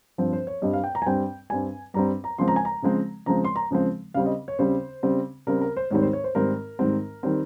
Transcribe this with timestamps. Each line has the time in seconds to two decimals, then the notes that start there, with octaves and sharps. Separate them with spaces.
0.18 G2 F3 C4
0.33 C5
0.47 C#5
0.62 G2 G3 C4 D#5
0.73 F5
0.84 G5
0.95 A#5
1.02 G#5
1.06 G2 G3 C4 G5
1.50 G2 G3 C4 G#5
1.94 G2 G3 C4 A#5
2.24 A#5
2.38 C#3 F3 G#3 C4 C6
2.48 A#5
2.56 G#5
2.65 A#5
2.82 C#3 F3 G#3 C4
3.26 C#3 F3 G#3 C4 A#5
3.45 C6
3.56 A#5
3.71 C#3 F3 G#3 C4
4.14 C#3 G3 C4 F5
4.26 D#5
4.48 C#5
4.59 C#3 G3 C4 C5
5.03 C#3 G3 C4
5.47 C#3 G3 C4 A#4
5.61 A#4
5.77 C5
5.91 G#2 D#3 G3 C4 C#5
6.02 C5
6.13 C#5
6.24 C5
6.35 G#2 D#3 G3 C4 A#4
6.79 G#2 D#3 G3 C4
7.23 D#3 G3 C4